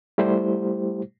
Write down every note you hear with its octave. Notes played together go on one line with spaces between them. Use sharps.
G3 A3 E4 G4 C5